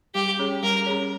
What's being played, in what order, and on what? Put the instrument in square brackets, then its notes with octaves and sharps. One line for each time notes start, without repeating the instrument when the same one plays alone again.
[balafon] G3 [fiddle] G4
[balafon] C#4 G#4 C#5
[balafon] G3 [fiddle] A#4
[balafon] C#4 G#4 C#5